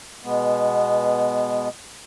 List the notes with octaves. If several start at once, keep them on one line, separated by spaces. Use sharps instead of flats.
B2 G#3 B3